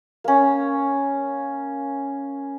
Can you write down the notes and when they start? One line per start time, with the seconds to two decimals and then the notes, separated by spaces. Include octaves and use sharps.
0.24 A#3 C#4